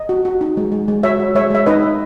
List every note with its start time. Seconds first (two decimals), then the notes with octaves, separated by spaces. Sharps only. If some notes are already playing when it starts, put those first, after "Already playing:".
Already playing: D#5
0.09 F#4
0.25 F#4
0.41 D#4
0.57 G#3
0.72 G#3
0.88 G#3
1.03 F#4 C#5 E5
1.20 F#4
1.35 G#3 C#5 E5
1.50 G#3 E5
1.66 D#4 B4 D#5
1.82 D#4